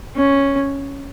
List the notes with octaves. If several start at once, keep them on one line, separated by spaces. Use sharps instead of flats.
C#4